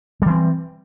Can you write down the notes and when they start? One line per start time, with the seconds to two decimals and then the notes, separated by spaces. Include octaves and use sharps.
0.22 G3
0.26 E3
0.30 C4